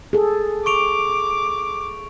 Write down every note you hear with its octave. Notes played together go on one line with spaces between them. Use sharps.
G#4 A4
C#6 D6 D7 F7